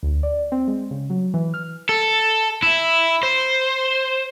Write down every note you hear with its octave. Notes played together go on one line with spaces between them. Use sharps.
D2
D5
C4
G#3
C#3
F#3
E3
F6
A4
E4
C5